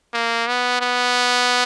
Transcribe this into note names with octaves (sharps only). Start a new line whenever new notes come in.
A#3
B3
B3